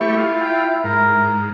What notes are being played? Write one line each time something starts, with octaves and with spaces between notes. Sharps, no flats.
A3 E4 G4 C#6
F4
G5
G#2 A#4